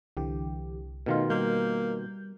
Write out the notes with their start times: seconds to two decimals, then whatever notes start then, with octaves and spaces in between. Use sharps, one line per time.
0.17 C2 D3 E3 G4
1.06 B2 D#3 A3 D#4 F4 F5
1.30 G3 A#3 G6